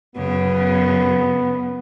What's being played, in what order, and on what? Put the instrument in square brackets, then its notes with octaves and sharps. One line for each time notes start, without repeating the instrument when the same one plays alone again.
[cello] F#2 C#3 [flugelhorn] B3